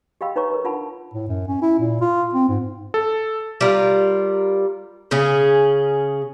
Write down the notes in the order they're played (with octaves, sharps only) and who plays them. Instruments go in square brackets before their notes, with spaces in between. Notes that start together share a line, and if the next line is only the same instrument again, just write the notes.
[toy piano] G4 D#5 F5 G5 B5 E6
D#4 B4 C#5 A#5 C#6
A#4 B4
D4 F4 A#4 F#5 A5 B5
[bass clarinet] A2
F#2
C#4
E4
A#2
F4
C4
G#2
[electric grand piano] A4
[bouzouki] G3 F4 A#4
C#3 C#4 G#4